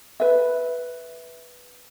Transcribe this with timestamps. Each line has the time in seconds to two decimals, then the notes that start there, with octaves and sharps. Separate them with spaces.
0.20 B4 E5